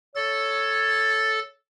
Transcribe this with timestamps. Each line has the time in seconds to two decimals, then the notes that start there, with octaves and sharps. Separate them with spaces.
0.16 A4 C#5 A6